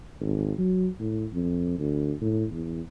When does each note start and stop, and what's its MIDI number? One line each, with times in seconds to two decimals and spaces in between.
0.20 0.52 32
0.59 0.87 54
0.99 1.26 45
1.33 1.78 41
1.78 2.13 38
2.21 2.45 45
2.51 2.81 40